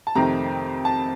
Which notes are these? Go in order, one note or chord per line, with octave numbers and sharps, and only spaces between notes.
A5
F2 C3 D#3 A3 C4 A#5
A5